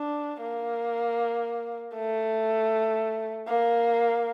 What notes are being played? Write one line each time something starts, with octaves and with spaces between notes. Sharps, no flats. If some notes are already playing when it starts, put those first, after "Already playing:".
Already playing: D4
A#3
A3
A#3